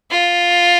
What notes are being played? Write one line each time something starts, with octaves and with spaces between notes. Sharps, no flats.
F4